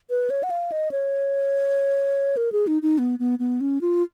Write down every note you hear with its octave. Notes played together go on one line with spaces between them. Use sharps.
B4
C#5
F#5
F5
D#5
C#5
A#4
G#4
D#4
D#4
B3
B3
B3
C#4
F4